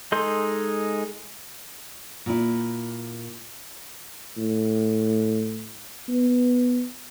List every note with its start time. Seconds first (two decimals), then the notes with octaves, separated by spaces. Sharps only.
0.12 G#3 D#4 A4 C6 G6
2.26 A#2 E4
4.37 A2
6.08 B3